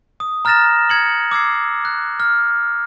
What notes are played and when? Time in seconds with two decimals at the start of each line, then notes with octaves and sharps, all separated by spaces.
0.20 D#6
0.45 A#5 F6 F#6 A6 A#6 E7
0.90 G#6 C#7 F#7
1.31 D6 E6 G#6 C7
1.85 F#6
2.20 F6